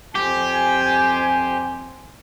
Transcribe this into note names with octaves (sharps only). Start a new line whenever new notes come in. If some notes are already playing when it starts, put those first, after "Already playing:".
F2 G4 C5 G#5